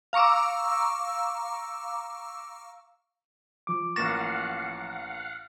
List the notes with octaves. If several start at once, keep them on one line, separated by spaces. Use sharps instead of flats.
F5 A#5 C#6 D6 E6
F3 D6
A1 A#3 F5 F#5 C#6 A6 A#6 E7